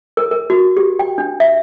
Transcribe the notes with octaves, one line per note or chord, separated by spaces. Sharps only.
A#4
A#4
F#4
G4
G5
D4
E5